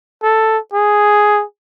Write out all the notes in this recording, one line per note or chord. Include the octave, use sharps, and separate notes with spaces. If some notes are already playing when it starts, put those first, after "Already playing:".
A4
G#4